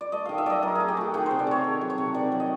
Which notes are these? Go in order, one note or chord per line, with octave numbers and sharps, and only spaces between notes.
D5
A3 D#5
D#3 F5
E5
F#3 D5 D#5
F#3 A#4
A3 G#4
G4
A3 F#4
D#3 G#4
C3 C5
D5
A3 C#5
D#3
F#3
C#5
C3
D#3 D5
F#3
D#5